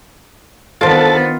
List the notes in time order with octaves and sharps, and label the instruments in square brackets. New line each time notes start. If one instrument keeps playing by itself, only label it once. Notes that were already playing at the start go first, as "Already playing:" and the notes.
[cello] D#3 B3 [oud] D4 C5 [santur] F4 [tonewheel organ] A4 A5